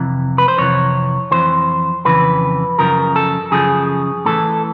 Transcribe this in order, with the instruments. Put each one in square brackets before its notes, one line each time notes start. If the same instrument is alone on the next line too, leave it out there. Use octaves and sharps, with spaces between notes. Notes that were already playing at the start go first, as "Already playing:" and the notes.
Already playing: [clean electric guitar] F2 C3 E3
B4
C5
F2 C3 E3 C#5
F2 C#3 E3 C5
F2 C#3 E3 B4
F#2 C#3 F3 A#4
A4
F#2 C#3 F3 G#4
A2 E3 A4